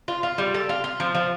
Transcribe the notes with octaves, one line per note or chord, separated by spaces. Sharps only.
F4
F4
G3
A4
F4
F4
F3
F3